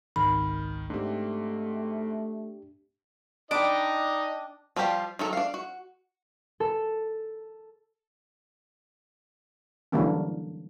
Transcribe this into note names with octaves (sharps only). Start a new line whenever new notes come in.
G#1 C#2 D#3 B5 F6
G#2 A3 C4 D4 G4
D4 D#4 D#5 G5 A5 B5 D6
F3 G3 F4 G4 A5
D#3 F#3 A4
D4 F5
F#4
A4
D3 E3 F#3 G3 A#3 C#4